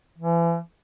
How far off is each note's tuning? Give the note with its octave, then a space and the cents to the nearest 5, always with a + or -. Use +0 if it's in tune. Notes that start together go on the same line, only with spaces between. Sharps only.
E3 +35